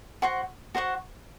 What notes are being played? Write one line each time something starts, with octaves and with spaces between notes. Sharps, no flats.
F#4 C5 F#5 C#6
F#4 C5 F#5 C#6